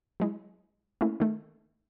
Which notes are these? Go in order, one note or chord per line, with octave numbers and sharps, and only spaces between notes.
F#3 G#3 E4
A3 A#3 C#4 E4
D#3 A3